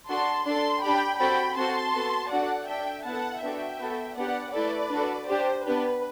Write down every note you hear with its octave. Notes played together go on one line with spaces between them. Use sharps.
D4 F#4 A4 A5 C6
D4 A4 A5 C6
D4 G4 G5 B5
C4 F#4 A4 G5 B5
C4 F#4 A4 A5 C6
B3 F#4 A4
D4 F#4 A4 D5 F#5
D4 A4 E5 G5
B3 E4 A4 F#5 A5
B3 D4 F#4 A4 E5 G5
B3 F#4 A4
B3 D4 G4 D5 F#5
A3 E4 A4 B4 D5
D4 F#4 A4
D4 G4 C5
B3 D4 G4 B4